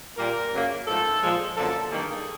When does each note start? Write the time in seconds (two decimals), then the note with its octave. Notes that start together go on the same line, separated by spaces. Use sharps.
0.17 A#2 G3 A#3 A#4
0.52 F#2 C#3 F#3 A#3
0.87 G#2 F3 A3 A4
1.21 A#2 F3 G#3
1.56 F#2 D3 F3 A#3 A4
1.91 G2 D#3 G3 A#3 G#4